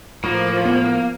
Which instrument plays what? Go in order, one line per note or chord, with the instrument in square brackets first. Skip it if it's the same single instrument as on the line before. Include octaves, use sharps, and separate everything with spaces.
[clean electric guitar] A2 [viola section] F3 [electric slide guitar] A#3
[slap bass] B3